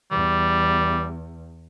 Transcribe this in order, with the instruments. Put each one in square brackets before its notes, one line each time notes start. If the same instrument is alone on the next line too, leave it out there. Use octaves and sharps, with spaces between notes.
[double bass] E2 [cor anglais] G3